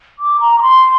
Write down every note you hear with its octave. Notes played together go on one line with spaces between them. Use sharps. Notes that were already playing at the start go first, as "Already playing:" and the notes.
D6
A#5
D6
C6